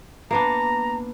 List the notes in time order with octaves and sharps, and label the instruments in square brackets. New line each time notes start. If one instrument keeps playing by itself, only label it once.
[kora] A#3 B3 D4 [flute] A#5